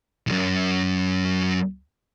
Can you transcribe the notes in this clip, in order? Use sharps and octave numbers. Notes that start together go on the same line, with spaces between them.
B1 F#2